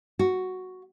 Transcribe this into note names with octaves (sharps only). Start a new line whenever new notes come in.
F#4